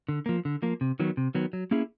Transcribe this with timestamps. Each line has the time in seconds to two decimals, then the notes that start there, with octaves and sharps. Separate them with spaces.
0.09 D3
0.26 F3 A#3
0.45 D3
0.62 F3 A#3
0.81 C3
1.00 D#3 F#3 B3
1.17 C3
1.35 D#3 F#3 B3
1.53 F#3
1.71 A#3 C#4 E4 G#4